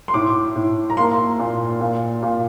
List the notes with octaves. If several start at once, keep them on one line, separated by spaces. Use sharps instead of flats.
C6
A2 D6
A2
A#5
A#3 C6
A#2
A#2
A#2